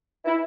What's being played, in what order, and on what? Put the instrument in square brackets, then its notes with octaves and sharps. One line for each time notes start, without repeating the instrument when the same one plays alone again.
[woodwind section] E4